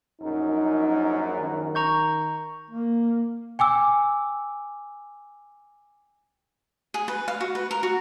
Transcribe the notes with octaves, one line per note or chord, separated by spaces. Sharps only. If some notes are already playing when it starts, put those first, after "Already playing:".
A#1 F#2 D#4 A#4
D#3
A#5 C#6 G6
A#3
G5 G#5 D6 E6
G#4
B4
F5
F#4
B4
A#4
F#4